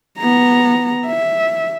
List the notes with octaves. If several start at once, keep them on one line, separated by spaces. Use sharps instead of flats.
B3 A#5
E5